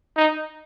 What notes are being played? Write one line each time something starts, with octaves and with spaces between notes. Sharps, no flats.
D#4